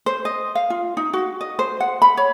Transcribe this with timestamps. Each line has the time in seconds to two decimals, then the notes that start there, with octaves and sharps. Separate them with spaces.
0.06 C5
0.25 D#5
0.55 F5
0.70 F4
0.97 D#4
1.13 F#4
1.41 D#5
1.59 C5
1.80 F#5
2.02 B5
2.17 C#5